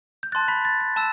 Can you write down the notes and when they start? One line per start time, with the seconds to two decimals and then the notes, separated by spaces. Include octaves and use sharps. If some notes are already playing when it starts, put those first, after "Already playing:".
0.23 G6
0.32 A5 C6 F#6 A6
0.48 B5 B6
0.65 A6
0.81 A6
0.96 A5 E6 E7